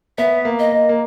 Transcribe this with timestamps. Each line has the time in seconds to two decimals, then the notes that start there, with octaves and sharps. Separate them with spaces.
0.18 B3 E5
0.45 A#3
0.59 D#5
0.72 A#3
0.89 A#3